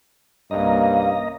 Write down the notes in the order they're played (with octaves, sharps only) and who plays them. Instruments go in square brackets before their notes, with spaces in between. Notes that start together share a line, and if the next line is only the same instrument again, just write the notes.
[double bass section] C2 A#3 C#4 [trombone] G2 [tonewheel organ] D#5 A#5 [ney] F5